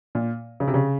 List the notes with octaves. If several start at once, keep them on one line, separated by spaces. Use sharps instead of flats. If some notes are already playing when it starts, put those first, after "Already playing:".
A#2
C#3
C3
C#3